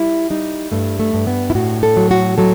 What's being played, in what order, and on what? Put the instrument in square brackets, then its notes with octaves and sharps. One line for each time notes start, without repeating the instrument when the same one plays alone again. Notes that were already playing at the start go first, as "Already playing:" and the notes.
Already playing: [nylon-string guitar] G3 E4
G3 D#4
G2 A3
A3
G2
B3
E4
A2 F#4
A4
F#3
F#4
F#3 A4